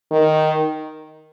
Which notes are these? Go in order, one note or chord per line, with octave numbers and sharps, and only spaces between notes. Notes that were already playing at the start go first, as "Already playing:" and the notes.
D#3